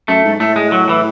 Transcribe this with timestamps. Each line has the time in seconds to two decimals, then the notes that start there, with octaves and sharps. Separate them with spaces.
0.08 F#2 A3
0.25 G#2
0.40 A2 A3
0.56 G#3
0.72 F#3
0.89 E3